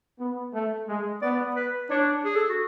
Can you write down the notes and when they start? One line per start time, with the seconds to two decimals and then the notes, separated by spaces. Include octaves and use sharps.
0.20 B3
0.53 A3
0.89 G#3
1.22 B3 D5
1.56 B4
1.90 D4 C#5
2.25 G#4
2.35 A4
2.49 F#4